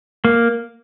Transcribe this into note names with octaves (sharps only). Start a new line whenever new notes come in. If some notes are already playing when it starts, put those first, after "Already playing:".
A#3